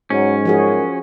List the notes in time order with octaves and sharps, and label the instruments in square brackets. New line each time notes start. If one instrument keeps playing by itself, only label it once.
[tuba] G#2 [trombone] F#3 [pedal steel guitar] C#4
[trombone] F#2 [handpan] F3 F#4 G#4